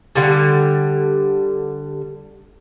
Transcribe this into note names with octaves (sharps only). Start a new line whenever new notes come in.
D3 G3